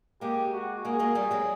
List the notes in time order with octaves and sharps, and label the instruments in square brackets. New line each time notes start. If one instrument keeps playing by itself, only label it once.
[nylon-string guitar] G#3 A#3 [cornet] G4
[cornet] F#4
[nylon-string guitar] G#3 A#3 [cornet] G#4
[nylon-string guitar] G#3 A#3
G3 A3
F#3 G#3